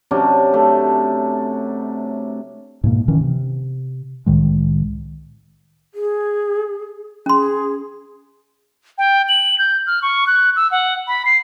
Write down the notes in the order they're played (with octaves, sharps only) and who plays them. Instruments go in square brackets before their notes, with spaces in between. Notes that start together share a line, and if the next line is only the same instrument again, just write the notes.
[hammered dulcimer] C3 F#3 C#4 D4
A3
[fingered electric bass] G#2 B2 A#3
D#3 E3 C#4
C3
C2 A2 D#3 G#3
[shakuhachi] G#4
[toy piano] C#4 C6 [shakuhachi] G#4
[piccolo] G5
F#7
G6
F6
C#6
F#6
E6
F#5
B5
C7